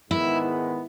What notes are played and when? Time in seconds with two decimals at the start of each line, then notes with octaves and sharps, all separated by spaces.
0.10 G#2 D#3 G#3 B3 E4